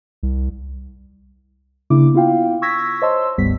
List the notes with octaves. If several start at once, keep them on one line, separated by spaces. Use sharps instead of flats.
C2
C#3 A#3 D4 E4 D6
B3 E4 F4 F5 G5
C#6 E6 G#6 A#6 B6
C5 C#5 D#5 A5 C6 E6
G1 D2 G#2 G3 B3 B6